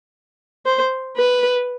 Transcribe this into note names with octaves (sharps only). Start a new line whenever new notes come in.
C5
B4